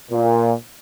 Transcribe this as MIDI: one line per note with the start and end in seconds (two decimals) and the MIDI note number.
0.11 0.53 46